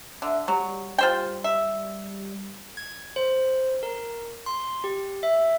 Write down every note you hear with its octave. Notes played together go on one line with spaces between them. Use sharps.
D3 E5
F#3 G3
F4 C5 G5
E5
G#6
C5
A#4
C6
G4
E5